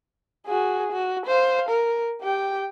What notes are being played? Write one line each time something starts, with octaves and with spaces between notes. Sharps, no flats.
F#4 G#4
F#4
C5 F5
A#4
G4 G5